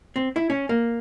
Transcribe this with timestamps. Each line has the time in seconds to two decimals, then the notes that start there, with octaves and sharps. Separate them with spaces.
0.16 C4
0.36 E4
0.50 C#4
0.69 A#3